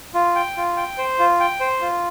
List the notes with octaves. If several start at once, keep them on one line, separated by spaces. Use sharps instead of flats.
F4
G5
F4
G5
C5
F4
G5
C5
F4